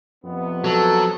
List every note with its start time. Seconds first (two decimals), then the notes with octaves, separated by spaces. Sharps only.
0.25 F2 C3 B3
0.64 F#3 A4